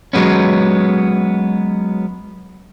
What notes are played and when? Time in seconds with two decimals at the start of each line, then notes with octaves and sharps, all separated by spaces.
0.13 F#3 G#3 B3 C#4